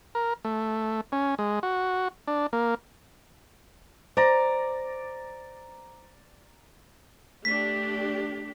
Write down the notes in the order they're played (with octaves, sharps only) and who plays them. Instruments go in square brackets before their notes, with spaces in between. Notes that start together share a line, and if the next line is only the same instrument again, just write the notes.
[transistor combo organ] A#4
A3
C#4
G#3
F#4
D4
A#3
[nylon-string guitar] C5 [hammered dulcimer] D5 A#5
[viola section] A3 D4 G4 [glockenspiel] B6